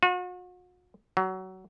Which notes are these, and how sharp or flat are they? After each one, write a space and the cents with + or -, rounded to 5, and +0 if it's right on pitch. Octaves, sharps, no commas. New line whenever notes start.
F#4 -45
F#3 +20